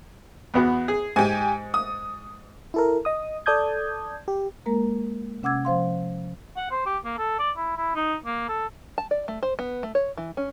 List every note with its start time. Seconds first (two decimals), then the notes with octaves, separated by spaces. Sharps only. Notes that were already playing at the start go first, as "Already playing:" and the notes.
0.54 E2 B3 F#4
0.88 G#4
1.16 G#2 G4 G#5
1.74 D#6
2.74 E4 A4 A#4
3.05 D#5 D#6
3.46 A4 D5 A5 D#6 G6 G#6
4.28 G4
4.66 G#3 A#3 A#4 A#5
5.43 C3 C#4 F#5 D6 E6 G#6
5.65 F3 C5 F5 C6
6.56 F#5
6.70 C5
6.86 G4
7.04 A#3
7.18 A4
7.39 D5
7.56 E4
7.77 E4
7.95 D#4
8.25 A#3
8.48 A4
8.98 A5
9.11 D5
9.28 A3
9.43 C5
9.59 B3
9.83 A3
9.95 C#5
10.18 E3
10.37 C#4